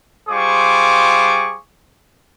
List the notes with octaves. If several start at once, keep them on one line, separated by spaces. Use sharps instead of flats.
G3 F4 G#4 C5 C#6 D6